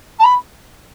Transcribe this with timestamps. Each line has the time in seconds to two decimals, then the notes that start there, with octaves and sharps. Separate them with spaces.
0.19 A5
0.23 B5